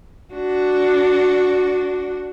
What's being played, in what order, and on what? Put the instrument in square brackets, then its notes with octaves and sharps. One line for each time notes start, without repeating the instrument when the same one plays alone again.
[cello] D4 F#4